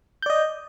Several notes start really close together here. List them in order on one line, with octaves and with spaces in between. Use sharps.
G6 D5 D#5